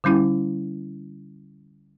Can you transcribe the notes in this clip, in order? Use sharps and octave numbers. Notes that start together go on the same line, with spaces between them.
D3 G3 C#4 E4